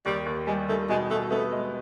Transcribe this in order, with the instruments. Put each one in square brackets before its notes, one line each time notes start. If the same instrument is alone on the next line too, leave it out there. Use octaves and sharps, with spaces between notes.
[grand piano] D#2 [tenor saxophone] G3
[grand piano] D#2
[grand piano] G3 [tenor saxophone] G#3
[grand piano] D#3 [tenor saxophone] A3
[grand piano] B2 [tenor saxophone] G#3
[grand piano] B2 [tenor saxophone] A3
[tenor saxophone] A3 [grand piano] B3
[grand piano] G#3